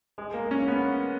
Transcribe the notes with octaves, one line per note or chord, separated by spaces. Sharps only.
G#3
A#3
C#4
B3